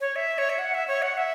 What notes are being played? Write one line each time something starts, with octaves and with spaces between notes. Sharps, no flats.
C#5
E5
C#5
E5
F#5
E5
C#5
F#5
E5